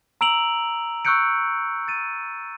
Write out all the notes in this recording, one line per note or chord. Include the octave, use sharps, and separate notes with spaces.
A#5 E6 D7 F7 F#7
C#6 E6 F#6 G6 C#7 D7
A6 D#7